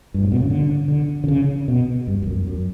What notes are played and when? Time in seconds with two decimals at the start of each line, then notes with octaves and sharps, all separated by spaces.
0.14 G2
0.23 A2
0.32 B2
0.41 C#3
0.50 D3
0.88 D3
1.24 D3
1.28 C#3
1.68 B2
2.07 G2
2.22 G2
2.27 F#2
2.47 F#2